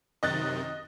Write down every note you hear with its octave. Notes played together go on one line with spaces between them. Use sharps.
F#2 C3 D#3 D#5 F#6 A6